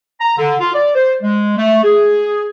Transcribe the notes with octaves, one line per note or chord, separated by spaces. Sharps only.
A#5
D3
F4
D5
C5
G#3
A3
G#4